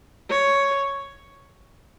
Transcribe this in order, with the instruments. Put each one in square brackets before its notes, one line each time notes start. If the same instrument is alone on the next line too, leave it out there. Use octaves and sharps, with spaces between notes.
[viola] C#5